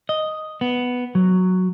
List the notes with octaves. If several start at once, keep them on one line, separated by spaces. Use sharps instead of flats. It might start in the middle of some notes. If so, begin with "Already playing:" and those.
D#5
B3
F#3